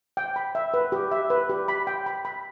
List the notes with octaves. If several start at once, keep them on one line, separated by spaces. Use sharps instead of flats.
G5
B5
E5
B4
G4
E5
B4
G4
B5
G5
B5
B5